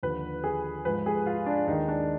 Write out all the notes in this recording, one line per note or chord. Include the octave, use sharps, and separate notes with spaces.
D#2 D3 F3 B4
G#4
G#2 F3 G#3 B4
G#4
F4
D4
D#2 D#3 G#3 D#4
D4